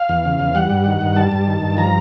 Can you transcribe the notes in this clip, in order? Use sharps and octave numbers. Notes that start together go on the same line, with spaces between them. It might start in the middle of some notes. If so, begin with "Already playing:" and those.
Already playing: F5
E2
C#3
E2
G3 F#5
G2
D#3
G2
G3 A5
G2
D#3
G2
F3 A#5